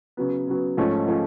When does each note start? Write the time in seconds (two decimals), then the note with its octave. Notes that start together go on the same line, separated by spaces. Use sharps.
0.17 C#3 F#3 B3
0.47 C#3 F#3 B3
0.77 G#2 F3 A3 C#4
1.08 F3 A3 C#4